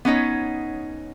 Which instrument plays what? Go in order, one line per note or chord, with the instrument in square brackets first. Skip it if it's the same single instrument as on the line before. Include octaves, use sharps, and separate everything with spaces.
[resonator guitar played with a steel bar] B3 C#4 D#4 C#5